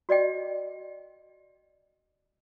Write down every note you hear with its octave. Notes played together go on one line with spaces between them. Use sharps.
F#4 D5 D#5 G5